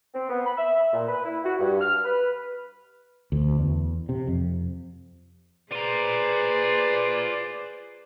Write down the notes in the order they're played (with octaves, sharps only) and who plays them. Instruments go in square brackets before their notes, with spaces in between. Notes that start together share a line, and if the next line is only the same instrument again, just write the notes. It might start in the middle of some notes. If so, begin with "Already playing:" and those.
[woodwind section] C4
B3
B5
E5
A#2
B4
E4
F#4
G2
F6
B4
[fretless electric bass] D2
E2
C3
F2
[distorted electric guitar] F4 A#5 [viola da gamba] G#4 B4 C5 [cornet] D5